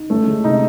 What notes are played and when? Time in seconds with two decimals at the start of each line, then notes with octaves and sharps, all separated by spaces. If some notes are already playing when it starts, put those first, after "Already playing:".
Already playing: D#4
0.10 A3 C#4
0.27 G#3
0.44 C3 D#4